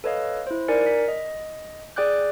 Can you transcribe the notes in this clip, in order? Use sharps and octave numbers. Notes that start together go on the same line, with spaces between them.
A4 B4 C#5 D#5 F5
E4 C5
D#4 A#4 D5 G#5 C#7
B6
D#5
G#4 D5 G5 D6 F#6 G6